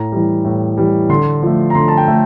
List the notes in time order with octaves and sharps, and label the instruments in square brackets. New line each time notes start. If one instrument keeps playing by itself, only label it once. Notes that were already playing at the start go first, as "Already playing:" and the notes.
Already playing: [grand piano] A2 A#5
E3 G3
A2
E3 G3
D3 C6
F3 A3
A#5
D3 C6
A5
G5
A3